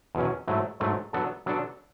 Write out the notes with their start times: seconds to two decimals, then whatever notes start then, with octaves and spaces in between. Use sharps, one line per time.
0.15 E2 B2 F#3 C#4
0.48 G#2 F#3 A3 E4
0.80 G#2 F#3 A3 E4
1.13 F#3 B3 D4 A4
1.46 F#3 B3 D4 A4